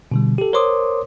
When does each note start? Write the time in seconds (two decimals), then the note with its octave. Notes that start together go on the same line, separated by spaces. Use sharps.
0.11 B2 D3 G3
0.38 G4 A4
0.53 A#4 C5 C#5 C6 D6 D#6